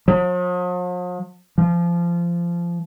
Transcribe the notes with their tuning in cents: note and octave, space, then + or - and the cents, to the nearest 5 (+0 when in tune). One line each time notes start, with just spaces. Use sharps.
F3 +45
F3 -20